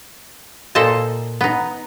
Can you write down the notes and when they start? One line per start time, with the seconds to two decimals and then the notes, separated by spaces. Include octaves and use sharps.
0.75 A#2 A4 C5 D#5 A5
1.41 B3 D#4